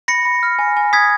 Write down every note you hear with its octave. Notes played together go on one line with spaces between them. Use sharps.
B5 A#6 C#7
B5
F6
G#5
G#5
D#6 G#6 B6